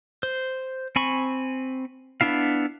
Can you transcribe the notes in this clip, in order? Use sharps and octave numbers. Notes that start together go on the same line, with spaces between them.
C5
C4 G#5 B5 C#6
B3 D4 E4 F5